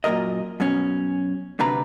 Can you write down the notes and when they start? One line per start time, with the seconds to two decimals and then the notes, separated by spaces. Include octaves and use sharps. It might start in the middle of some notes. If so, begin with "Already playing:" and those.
0.04 F#2 A#2 F3 A#4 D#5
0.60 F#2 B2 C#4
1.59 D2 C3 D4 B4 A#5